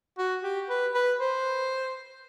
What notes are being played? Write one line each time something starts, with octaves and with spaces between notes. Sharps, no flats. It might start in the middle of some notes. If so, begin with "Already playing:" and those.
F#4
G4
B4
B4
C5